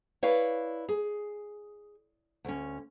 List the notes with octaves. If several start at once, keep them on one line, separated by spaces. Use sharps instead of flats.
E4 B4 C#5 D5 F5
G#4
D2 C#4